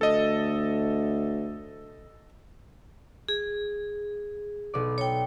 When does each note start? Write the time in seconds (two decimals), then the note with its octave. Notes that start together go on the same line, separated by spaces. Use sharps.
0.01 D2 A4 D#5
3.29 G#4
4.74 B1 D5
4.98 C#5 G5